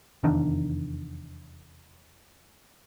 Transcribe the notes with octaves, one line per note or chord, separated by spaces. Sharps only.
F1 E2 D#3 D4